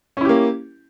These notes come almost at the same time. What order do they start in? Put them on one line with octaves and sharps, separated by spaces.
C#4 E4 G4 A#3